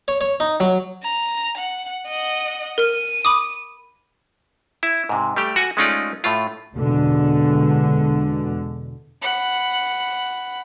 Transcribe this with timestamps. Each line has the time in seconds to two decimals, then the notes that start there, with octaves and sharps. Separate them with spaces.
0.08 C#5
0.21 C#5
0.40 D#4
0.60 F#3
1.03 A#5
1.57 F#5
2.07 D#5 F#5
2.78 A#4 F6 D#7
3.25 B5 D6 D#6
4.83 E4
5.09 G#2 C3
5.36 G3 A3 G4
5.56 F#4 F#5 G#5
5.77 G#3 A3 C#4 D#4 F4 D5
6.24 A2 A3 F4
6.74 E2 B2 D3 G#3
9.22 F#5 B5